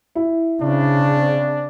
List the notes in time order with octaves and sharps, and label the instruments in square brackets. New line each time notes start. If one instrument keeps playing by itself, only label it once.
[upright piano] E4
[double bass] C#3 [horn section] C4 D4